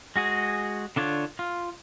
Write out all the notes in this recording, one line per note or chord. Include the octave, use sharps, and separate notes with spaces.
G#3 F#4 G#4
D3 D4 F4 C#5
F4